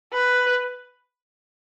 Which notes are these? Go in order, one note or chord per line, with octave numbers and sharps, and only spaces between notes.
B4